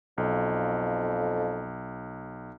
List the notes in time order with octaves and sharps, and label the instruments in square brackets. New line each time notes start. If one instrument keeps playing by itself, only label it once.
[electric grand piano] B1 [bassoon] F2